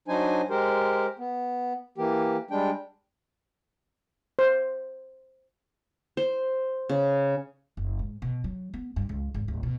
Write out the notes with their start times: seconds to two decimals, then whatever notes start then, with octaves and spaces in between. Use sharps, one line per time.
0.08 F#3 D4 D#4 C5 G#5
0.50 G#3 G4 A#4 C5
1.19 B3
1.98 E3 A#3 G4
2.51 G3 G#3 D4 G5
4.39 C5
6.17 C5
6.89 C#3
7.77 F#1
7.99 G#2
8.22 B2
8.44 F#3
8.74 B3
8.96 G2
9.09 C#2
9.34 G#1
9.48 D1
9.63 B2